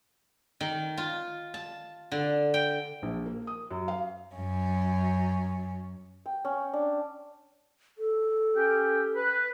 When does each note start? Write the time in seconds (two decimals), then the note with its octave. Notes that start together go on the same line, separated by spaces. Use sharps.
0.61 D#3
0.97 F4
1.54 A5
2.12 D3
2.54 G5
3.02 A#1
3.26 A#3
3.47 D#6
3.71 F#2
3.88 F5
4.35 F#2 C#4
6.26 G5
6.45 C#4
6.73 D4
7.98 A4
8.55 C#4 G4 G5
9.15 B4